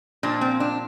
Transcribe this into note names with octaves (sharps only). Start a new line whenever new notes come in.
A#2 F3 D4
C4
D4